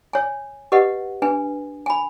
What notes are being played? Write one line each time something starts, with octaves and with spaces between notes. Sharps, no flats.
C#5 G#5
G4 B4 D#5 F#5
D4 B4 G#5
G#5 B5